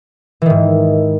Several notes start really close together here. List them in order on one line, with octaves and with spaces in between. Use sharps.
E3 D#3 G#2